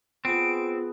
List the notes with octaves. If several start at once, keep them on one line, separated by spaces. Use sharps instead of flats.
B3 C4 F4 G#4 D7